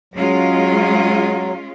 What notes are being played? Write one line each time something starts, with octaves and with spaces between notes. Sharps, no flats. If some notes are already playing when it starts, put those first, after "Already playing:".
F#3 G#3 C#4 F4